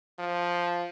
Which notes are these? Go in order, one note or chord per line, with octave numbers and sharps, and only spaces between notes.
F3